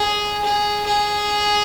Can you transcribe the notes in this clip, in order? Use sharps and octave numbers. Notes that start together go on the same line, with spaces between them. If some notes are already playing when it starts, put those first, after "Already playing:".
Already playing: G#4
G#4
G#4